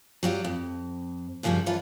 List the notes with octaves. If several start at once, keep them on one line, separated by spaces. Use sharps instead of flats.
F#3 G3 F4 G4
F2
F#2 C#3 F3 G3 C#4
F#2 E3 G3 F4 A4